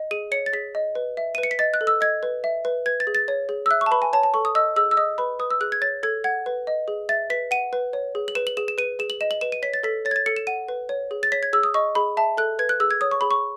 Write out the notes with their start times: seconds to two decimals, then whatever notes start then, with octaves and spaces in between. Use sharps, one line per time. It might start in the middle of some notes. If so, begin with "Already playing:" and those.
Already playing: D#5
0.11 G#4 D#7
0.32 C#5 C#7
0.46 A6
0.53 G#4 B6
0.75 D#5
0.95 B4
1.17 E5
1.35 D#7
1.38 B4
1.43 C#7
1.51 B6
1.59 D#5 A6
1.74 F#6
1.81 A4
1.87 E6
2.01 D#5 G#6
2.23 B4
2.44 E5
2.65 B4
2.86 B4 G#6
3.00 A6
3.07 G#4
3.15 A6
3.28 C#5
3.49 G#4
3.66 E6
3.71 E5 F#6
3.81 C#6
3.86 A5
3.91 B4 B5
4.02 G#5
4.13 C#5 A5
4.23 A5
4.34 A4 C#6
4.45 D#6
4.55 D#5 E6
4.76 G#4 E6
4.91 E6
4.97 D#5 D#6
5.18 B4 B5
5.39 B4 D#6
5.51 E6
5.61 G#4 F#6
5.72 G#6
5.81 C#5 A6
6.03 A4 G#6
6.24 F#5 G#6
6.46 B4
6.67 D#5
6.88 G#4
7.09 E5 A6
7.30 B4 B6
7.51 F#5 D#7
7.73 B4
7.93 C#5
8.15 G#4
8.28 F#7
8.35 B4 E7
8.47 F#7
8.57 G#4 E7
8.68 E7
8.78 B4 D#7
8.99 G#4 E7
9.10 F#7
9.21 D#5 E7
9.31 F#7
9.41 B4 E7
9.52 D#7
9.62 C#5 B6
9.74 A6
9.83 A4 B6
10.05 C#5 A6
10.11 G#6
10.16 A6
10.26 A4 C#7
10.36 E7
10.47 F#5 D#7
10.68 B4
10.89 C#5
11.11 G#4
11.23 A6
11.32 C#5 B6
11.43 G#6
11.53 G#4 E6
11.63 D#6
11.74 D#5 C#6
11.95 G#4 B5
12.17 E5 A5
12.38 A4 F#6
12.59 B4 G#6
12.69 F#6
12.80 G#4 E6
12.91 G#6
13.01 C#5 D#6
13.11 C#6
13.21 G#4 B5
13.31 C#6